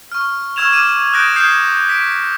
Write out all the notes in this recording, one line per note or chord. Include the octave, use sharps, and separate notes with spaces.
C#6 F6
C#6 E6 F6 G#6 E7 F7
D6 E6 F6 D#7 E7
D#6 F#6 G6 A#6 D7
D#6 F6 G6 G#6 C7 C#7
B6 D7